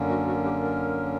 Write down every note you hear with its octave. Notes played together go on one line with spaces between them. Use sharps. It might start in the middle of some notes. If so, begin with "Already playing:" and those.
Already playing: F#2 D3 A#3 C#4
F#4
F#4
G4
A#4